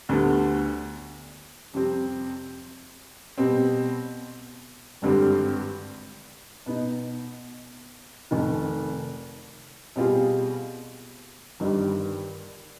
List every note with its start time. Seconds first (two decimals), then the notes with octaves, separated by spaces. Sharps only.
0.09 D2 D3 G3 B3
1.73 F2 C3 G3 C4
3.38 B2 G3 C4
5.02 G#1 G2 D3 G3 C4
6.66 B2 B3 D#4
8.31 F1 F2 D#3
9.96 B2 G3 C4 F4 G#4
11.60 G1 G2 D#3 G3 D4